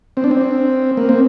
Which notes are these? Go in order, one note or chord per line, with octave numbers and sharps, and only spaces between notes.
C4
D4
C4
A#3
C4